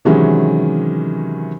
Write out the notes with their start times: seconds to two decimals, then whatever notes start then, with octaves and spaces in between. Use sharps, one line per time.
0.05 C3 D#3 E3 F#3 G#3 C#4